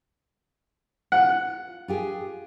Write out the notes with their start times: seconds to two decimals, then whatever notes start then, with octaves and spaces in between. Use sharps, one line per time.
1.12 F4 F#5
1.88 F4 G4 G#4